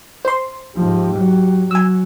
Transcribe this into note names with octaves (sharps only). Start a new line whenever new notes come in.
C5 C6
G#2 F3 G4
F#3
F#3 G#5 E6